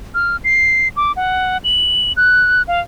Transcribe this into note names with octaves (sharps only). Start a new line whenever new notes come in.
F6
C7
D6
F#5
F#7
F#6
F5